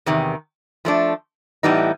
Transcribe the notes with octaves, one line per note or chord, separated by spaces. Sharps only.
E2 C3 D#3
F3 A3 D4
A2 E3 G3 B3 D#4